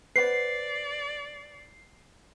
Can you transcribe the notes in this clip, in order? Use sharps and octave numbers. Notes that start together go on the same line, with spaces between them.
B4 C5 D5 F#5 C7